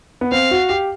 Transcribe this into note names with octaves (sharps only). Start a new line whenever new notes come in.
B3
C4 F5
F#4
G4